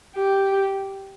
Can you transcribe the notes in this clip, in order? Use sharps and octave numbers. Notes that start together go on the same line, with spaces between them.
G4